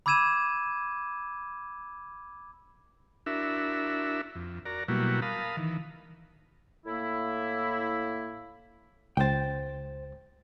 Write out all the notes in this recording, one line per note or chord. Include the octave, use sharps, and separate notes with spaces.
B5 D6 E6 G#6 D#7 E7
D4 E4 F#4 A#4 E5
F2
F#4 A#4 D5 A#5
B2 F#3 G3 A#3 E4 F#4
A#4 F5 A5 B5 D#6
D#3 E3
A2 A#3 E4
C#2 C5 G5 A6